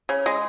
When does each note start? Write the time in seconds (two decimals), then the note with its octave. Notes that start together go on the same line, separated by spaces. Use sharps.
0.09 C#3
0.26 G#3